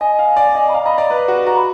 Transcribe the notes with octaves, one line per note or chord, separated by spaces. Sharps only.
D#5 G#5
F5
D5
D#5
B5
F5 A#5
D#5 B5
D5 A#5
B4
F#4
F#4 A#5
B5